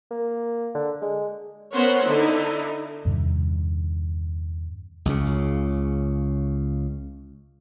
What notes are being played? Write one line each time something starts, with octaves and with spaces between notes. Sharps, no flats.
A#3
D3
G#3
B3 C#4 A#4 C5 C#5 F#5
D3 D#4 E4
E2 G2 C3 D#3
C#2 C#3